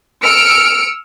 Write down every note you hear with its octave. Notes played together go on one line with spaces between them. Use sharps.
E6 F6 C#7 D7